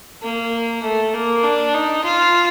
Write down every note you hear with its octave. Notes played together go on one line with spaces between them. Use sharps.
A#3
A3
A#3
D4
D#4
F4